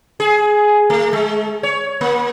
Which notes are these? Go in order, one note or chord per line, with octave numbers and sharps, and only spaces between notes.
G#4
A3
G#3
C#5
A#3